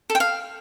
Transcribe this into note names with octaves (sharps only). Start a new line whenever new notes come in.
A4
G5
F5